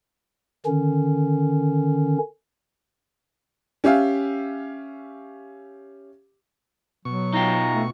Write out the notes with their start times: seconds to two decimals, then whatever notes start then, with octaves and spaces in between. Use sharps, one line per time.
0.66 D3 D#3 C#4
3.84 C#4 G4 E5 F5
7.05 B2 F#3 C#6
7.34 D#4 F4 G5 A#5
7.75 A3